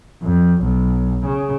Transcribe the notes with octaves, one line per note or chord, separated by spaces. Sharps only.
F2
B1
C#3